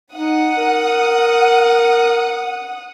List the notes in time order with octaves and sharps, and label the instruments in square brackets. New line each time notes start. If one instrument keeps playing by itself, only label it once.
[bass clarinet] D#4 [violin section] F#5 D#6
[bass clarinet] A#4